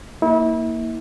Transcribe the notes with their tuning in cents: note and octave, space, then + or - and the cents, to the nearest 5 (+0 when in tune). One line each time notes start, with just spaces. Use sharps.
A#3 +0 E4 -35